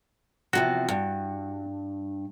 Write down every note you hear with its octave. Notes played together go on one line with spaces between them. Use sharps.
E2 C3 F3 F#4
G2